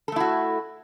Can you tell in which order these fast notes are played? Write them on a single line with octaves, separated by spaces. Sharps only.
A4 A3 E4 F#4